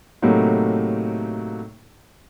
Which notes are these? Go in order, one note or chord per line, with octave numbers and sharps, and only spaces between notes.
A2 C3 F#3 A3 A#3 D#4